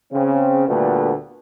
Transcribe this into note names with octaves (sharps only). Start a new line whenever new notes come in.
C#3 C4
D2 A#2 D3 G3 A3 B3